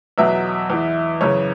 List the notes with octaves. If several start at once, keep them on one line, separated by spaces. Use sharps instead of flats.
E2 B2 F#3 E5
E2 E3
F#2 C#3 E3 C#5